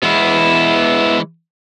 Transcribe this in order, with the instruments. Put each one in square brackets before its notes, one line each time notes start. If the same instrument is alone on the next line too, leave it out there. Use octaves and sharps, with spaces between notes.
[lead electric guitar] E3 G#3 [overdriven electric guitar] B3 E4